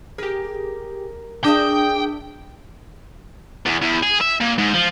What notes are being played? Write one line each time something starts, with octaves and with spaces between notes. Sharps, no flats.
G4 G#4 A#4
D4 G#4 E5 G5 D6 D#6 G6
E2
E2
G#4
E5
A#2
G#2
F3